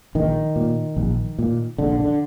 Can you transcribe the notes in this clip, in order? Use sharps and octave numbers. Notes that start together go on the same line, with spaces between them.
A#1 D#3
A#2
A#1
A#2
A#1 D3
D3